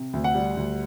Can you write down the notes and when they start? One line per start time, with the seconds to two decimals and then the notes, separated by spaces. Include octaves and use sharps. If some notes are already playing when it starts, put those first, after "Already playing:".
Already playing: C3
0.13 D2
0.24 F#5
0.35 G3
0.57 D2